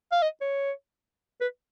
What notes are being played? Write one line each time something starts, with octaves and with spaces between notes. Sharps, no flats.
F5
D#5
C#5
B4